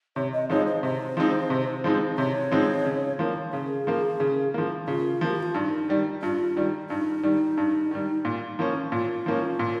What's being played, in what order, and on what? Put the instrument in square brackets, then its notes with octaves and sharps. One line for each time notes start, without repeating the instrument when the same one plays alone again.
[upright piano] C3 [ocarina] C#5
[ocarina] D#5
[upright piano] F3 G#3 C4 D#4 [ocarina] C#5
[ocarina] C5
[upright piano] C3 [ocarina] C5
[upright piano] F3 G#3 C4 D#4
C3
F3 G#3 C4 D#4
[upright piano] C3 [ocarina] C#5
[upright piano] F3 G#3 C4 D#4
C#3
F3 A#3
[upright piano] C#3 [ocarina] G#4
[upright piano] F3 A#3
C#3
F3 A#3
[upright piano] C#3 [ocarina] F4
[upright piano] F3 A#3
[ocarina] G4
F4
[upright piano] G2 [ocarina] D#4
[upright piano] D#3 G3
[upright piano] G2 [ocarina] F4
[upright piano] D#3 G3
[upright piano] G2 [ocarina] D#4
[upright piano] D#3 G3
G2
D#3 G3
A#2
F3 A#3 C#4
[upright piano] A#2 [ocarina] F4
[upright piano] F3 A#3 C#4
A#2